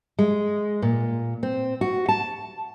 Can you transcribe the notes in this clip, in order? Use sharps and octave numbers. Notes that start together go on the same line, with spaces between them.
G#3
A#2
C4
F#4
A5